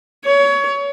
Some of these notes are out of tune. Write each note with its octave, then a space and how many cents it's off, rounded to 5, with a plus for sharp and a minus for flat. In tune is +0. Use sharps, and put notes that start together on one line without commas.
C#5 +25